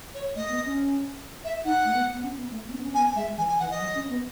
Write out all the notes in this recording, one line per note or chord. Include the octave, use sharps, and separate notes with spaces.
C#5
A3 D#5
B3
C#4
E5
D#4 F#5
A3
B3
B3
C#4
B3
A3
B3
C#4
B3
C#4
B3 G#5
G#3 E5
E3 G#5
G#5
E3 F#5
D#5
F#3
C#4
B3